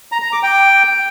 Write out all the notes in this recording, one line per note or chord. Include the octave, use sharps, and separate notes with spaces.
A#5
A#5
D6
G5